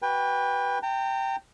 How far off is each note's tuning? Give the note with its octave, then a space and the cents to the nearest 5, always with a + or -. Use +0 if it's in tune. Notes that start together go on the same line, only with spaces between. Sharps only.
F#4 +40 B4 -10 G5 +30
G5 +0 A#5 -40